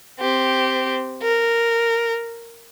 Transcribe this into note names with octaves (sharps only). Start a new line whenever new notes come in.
C4 G4
A#4